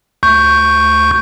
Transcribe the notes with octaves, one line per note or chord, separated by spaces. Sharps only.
D2 C#6 G6